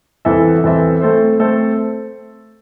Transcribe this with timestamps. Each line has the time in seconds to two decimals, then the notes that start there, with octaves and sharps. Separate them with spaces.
0.25 E2 E3 C4 A4 E5
0.64 E2 E3 C4 A4 E5
1.01 A3 C4 A4 C5
1.40 A3 C4 A4 C5